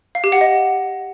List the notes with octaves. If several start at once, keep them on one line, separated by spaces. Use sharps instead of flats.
F5
G4
F#5
D#5